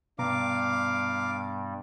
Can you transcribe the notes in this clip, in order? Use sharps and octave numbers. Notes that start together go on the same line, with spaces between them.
G2 B2 G3 B3 F5 A#5 D6